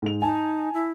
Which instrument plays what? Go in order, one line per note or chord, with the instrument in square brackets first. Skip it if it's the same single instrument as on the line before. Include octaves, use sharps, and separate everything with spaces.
[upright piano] G#2 G#3 F7
[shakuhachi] D#4 [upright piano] G#5 A5
[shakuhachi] E4